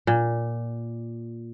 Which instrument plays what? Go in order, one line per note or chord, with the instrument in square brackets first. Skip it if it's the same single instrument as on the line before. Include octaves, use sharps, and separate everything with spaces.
[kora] A#2